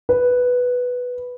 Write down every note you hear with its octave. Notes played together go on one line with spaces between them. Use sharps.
B4